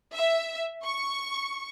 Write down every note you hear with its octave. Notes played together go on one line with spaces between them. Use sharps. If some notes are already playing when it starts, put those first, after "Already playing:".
E5
C#6